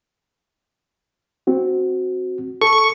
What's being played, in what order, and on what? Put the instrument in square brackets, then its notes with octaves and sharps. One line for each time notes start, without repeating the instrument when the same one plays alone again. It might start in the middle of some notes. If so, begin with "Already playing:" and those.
[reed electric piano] C4 F#4
[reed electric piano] A4 [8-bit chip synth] C#6